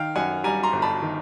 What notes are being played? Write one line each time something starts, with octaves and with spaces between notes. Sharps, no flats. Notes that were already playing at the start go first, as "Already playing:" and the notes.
Already playing: D#3 F5 G5
F#2 F#5 G#5
G3 G#5 A#5
A#5 C6
G1
A5 B5
D#3